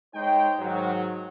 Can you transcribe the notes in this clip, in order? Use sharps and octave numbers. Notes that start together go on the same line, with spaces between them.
G#3 D#4 C5 C#5 G5
G#2 D#3 F#3